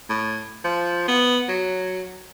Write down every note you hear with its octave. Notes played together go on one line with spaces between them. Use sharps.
A2
F3
B3
F#3